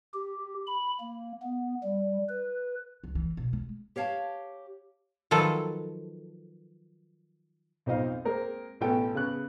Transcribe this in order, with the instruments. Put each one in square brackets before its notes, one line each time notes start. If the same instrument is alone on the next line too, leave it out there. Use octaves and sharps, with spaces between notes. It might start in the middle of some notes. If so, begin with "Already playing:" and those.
[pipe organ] G4
B5
A#3
B3
G3
B4
[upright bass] C#2
E3
B2
G#3
[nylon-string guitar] G4 C#5 F5 G5 A5
[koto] D#3 F3 F#3 A4 B4
[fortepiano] B1 F2 C4 D#4 D#5 F5
G#3 A#3 C4 A#4
A1 B2 B3 A4 G5 A5
C#3 B3 F#6